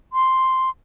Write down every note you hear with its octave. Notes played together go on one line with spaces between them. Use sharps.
C6